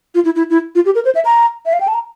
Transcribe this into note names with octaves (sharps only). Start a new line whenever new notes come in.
F4
E4
E4
E4
F4
G4
A#4
C5
E5
A#5
E5
F5
G5
A5
A#5